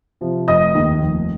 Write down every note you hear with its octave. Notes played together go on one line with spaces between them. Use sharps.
C3 F3
F1 D#5 D#6
D#2 D#3
F1